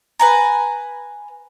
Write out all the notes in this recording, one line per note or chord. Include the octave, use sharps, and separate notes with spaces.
B4 G#5 A#5